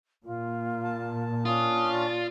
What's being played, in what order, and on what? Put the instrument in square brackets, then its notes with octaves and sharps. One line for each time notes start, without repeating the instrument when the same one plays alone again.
[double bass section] A#2 [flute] F4
[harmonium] A5
[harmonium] C#4 D4 [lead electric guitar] F4 [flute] D#6
[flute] D5